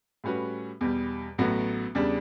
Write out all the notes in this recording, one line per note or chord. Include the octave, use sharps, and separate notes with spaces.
A2 G3 C#4 F#4 B4
E2 B2 G3
A1 A2 F#3 B3 F#4
E2 C#3 G3 D4